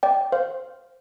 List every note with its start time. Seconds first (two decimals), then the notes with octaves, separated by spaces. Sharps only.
0.03 D5 G5
0.32 C5 F5